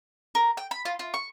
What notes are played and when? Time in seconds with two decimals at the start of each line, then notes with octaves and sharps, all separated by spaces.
0.35 A#4
0.57 G5
0.71 B5
0.85 F4
0.99 F4
1.14 C#6